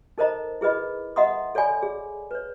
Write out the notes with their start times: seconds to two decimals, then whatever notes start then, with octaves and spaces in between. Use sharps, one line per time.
0.18 D#4 A4 A#4 C5 D#5 A#5
0.61 E4 G#4 B4 D#5 B5
1.16 D#5 E5 F#5 A#5 C6 D#6
1.55 A4 C#5 D5 G#5 B5
1.82 G#4
2.31 B4 C#5